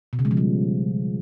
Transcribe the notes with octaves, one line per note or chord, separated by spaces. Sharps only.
B2
C#3
G#3
F3
G3